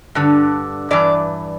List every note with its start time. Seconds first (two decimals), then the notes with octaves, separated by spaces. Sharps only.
0.15 G2 D3
0.91 G2 E3 D5